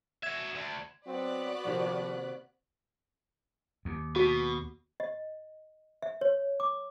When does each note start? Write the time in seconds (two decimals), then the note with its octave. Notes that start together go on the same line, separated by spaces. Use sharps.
0.23 F#4 E5 G#6 E7
0.55 D2
1.07 F#3 B3 C4 F#4 D5 B5 F#6
1.65 C3 D#3 F3 A#3
3.85 D#2
4.16 B2 F#4
5.00 D#5
6.02 E5
6.21 C#5
6.60 D6